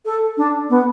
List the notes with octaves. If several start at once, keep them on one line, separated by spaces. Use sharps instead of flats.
A4
D4
B3